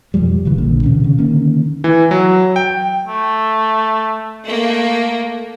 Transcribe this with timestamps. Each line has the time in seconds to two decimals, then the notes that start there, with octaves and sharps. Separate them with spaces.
0.14 F2 B2 F3 G3
0.45 D#1 C#3 E3 G3
0.58 A#1 D#2 A#2 D3
0.83 B2 D3 E3 C#4
1.04 C#3
1.18 D3 D#3 A#3 C#4
1.84 E3
2.11 F#3
2.56 G5
3.07 A3
4.44 A3 A#3